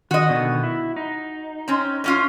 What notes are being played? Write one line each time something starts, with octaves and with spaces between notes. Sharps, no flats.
D#3 F#4 D5 D#5
B2 D3 D#3
E4
D#4
C4 C#4
A2 C#4 F4